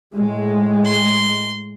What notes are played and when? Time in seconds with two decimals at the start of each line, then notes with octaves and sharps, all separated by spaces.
0.16 A2 G#3
0.85 C6